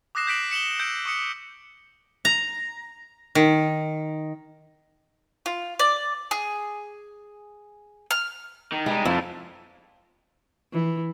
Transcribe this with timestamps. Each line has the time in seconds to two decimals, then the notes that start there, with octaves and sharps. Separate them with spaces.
0.15 D6 D#6 F#6 A#6 C7 E7
0.27 G6 A#6 B6 D7 E7 F#7
0.51 C#7 E7 F#7 G7
0.79 E6 G6 D7
1.05 C#6 D#6 C#7 E7
2.25 A#5
3.35 D#3
5.46 F4
5.79 D5
6.31 G#4
8.11 F6
8.72 D#3
8.86 G3 G#3 D#4
9.05 F2 A3 E4
10.73 E3